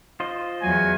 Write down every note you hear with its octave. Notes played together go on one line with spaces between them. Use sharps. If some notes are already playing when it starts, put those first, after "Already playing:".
F4 C5 D#5
E2 F#3 G#5